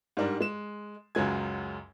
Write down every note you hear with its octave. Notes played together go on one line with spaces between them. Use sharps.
G#2 G3 D4 A#4
G#3 E7
C#2 F#2 F#3 G#3 G#5 G#6